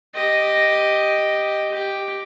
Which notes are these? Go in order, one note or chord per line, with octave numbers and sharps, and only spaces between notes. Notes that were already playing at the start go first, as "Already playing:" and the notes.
G4 D#5
G4